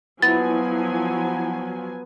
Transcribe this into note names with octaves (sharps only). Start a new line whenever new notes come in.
F3 F#3 B3 E4 G#5 A6